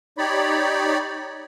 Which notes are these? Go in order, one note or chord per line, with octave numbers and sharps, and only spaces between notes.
D#4 G4 C#5 D5 B5